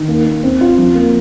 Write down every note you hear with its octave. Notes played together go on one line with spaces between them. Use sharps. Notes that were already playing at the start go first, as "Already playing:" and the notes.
Already playing: D#3
A#3
A#3
C4
F4
F3
A#3